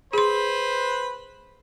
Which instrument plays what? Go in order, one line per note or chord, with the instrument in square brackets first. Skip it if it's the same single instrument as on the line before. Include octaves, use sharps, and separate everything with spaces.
[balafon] G#4 C6 [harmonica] B4 [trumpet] C5